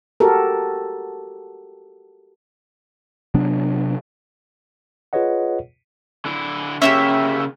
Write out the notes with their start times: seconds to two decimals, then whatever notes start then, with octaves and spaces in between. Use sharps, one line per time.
0.20 F#4 G4 A4 A#4
3.34 C3 F#3 B3 D4
5.13 F4 G#4 B4 C#5 D#5 F#5
6.25 D3 E4
6.82 C#3 A#3 C#4 D#4 G4 E5